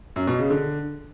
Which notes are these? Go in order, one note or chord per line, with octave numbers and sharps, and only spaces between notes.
F#2
B2
C#3
D3